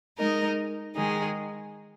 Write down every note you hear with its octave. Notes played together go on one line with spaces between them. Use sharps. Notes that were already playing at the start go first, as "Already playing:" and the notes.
G#3 D#4 A#4 D#5
D#3 G#3 D#4 G#4